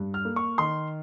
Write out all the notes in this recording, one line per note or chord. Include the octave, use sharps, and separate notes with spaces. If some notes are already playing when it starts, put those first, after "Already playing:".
Already playing: G2
F6
A#3
C#6
D#3 C6